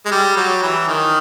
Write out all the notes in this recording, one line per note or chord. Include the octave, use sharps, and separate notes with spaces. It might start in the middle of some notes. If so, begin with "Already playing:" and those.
G#3
G3
F#3
E3
D#3